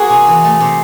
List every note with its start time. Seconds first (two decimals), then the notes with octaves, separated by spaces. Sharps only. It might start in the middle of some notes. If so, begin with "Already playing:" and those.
Already playing: A#3 F#4 G#4
0.09 C3
0.27 E3
0.44 A3
0.60 C3